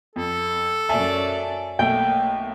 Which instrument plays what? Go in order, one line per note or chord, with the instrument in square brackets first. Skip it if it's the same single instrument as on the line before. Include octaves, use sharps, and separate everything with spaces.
[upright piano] F2 [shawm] A4
[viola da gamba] F#2 F#3 D5 [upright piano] E5 G#5 A5
[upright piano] B1 A3 G7 [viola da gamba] A#3 [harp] G5